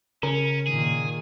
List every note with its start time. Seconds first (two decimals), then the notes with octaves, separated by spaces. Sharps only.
0.23 C#3 C#4 A#4
0.67 A#2 D#3 G#4